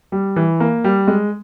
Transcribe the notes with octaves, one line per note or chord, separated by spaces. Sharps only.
G3
E3
A#3
G3
G#3